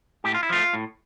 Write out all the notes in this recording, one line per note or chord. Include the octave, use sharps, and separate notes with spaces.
A2 G4
F4
E4
F3 A3 F4
A2